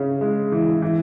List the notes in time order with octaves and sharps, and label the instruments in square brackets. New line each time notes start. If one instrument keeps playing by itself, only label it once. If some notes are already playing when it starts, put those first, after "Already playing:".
Already playing: [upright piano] C#3 C#4
G#3
E3
E3